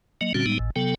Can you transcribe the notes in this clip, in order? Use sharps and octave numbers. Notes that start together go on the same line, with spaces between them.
F#3 A#3 D#5
A#2 D3 G3 C4 C#4 F#4
A2 G3 G#3 B3 D#4
G#1 A2
C3 F#3 B3 A4 G5